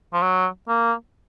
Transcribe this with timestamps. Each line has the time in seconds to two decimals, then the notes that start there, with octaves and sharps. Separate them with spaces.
0.13 F3
0.22 F#3
0.68 A#3